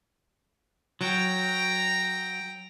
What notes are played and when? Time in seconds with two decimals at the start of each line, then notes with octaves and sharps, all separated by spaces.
1.01 F#3 G5 A#5